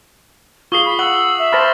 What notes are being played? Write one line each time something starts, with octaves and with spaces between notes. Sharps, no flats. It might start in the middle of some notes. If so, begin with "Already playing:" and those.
F4 G#4 C#6 D#6 C7 G7
B5
F#5 E6 F#7
E5
C5 A5 B5 F6 A6 A#6